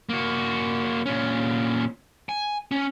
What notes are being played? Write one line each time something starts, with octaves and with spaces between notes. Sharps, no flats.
A#3 F#4
A#2 C#4
G#5
C#4